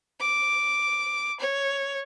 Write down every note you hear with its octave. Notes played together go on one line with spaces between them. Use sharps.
D6
C#5